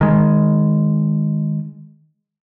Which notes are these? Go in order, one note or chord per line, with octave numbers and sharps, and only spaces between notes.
D#3 G#3